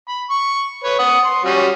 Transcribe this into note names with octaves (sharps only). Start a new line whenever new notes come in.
B5
C#6
B4 C#5
F#5 D#6
C6
G3 C#4 F#4